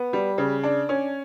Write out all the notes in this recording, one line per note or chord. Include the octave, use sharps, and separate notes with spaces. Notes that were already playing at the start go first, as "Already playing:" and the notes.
Already playing: B3
G3
C#3
D4
C#4